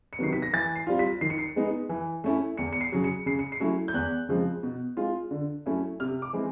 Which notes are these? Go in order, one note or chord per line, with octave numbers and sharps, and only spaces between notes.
C#7
C3 D#3 F#3 B3 C7
B6
A#6
E3 A6
C7
G3 C4 F4
B6
D#3 C7
C#7
C7
G#3 B3 D#4
E3
A3 C#4 E4
E2 C#7
C#7
C7
C#3 F#3
C#7
C#3 C7
C#7
C7
F#3 A3 C#4 E4
G6
E2 F#6
C#3 F3 G#3 C4
B2
G#3 C4 F4
D3
F#3 A3 C#4 E4
C3 F6
D6
E3 G#3 C4 E4